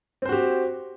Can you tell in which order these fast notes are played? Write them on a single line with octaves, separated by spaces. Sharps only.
C4 C5 F#4 G4